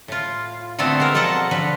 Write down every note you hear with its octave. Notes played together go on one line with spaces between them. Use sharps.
A2 F4
D3 A3 B3 C4 A4 C5
G#3 A#4
B2 F3 A4 F#5 A5 A#5
D3 F3 B4